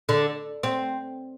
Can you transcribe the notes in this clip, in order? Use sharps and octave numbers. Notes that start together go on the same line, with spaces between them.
D3
C4